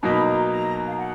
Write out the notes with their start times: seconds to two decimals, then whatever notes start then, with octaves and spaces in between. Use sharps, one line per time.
0.02 B2 F#3 A#3 D#4 B5
0.26 A#5
0.50 A#5
0.88 F5
0.96 F#5